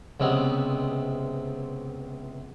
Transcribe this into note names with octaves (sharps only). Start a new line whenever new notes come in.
C#2 C3 G#3 B3